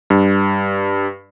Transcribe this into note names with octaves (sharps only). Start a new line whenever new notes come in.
G2